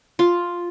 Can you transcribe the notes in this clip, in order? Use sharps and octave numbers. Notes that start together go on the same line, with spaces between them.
F4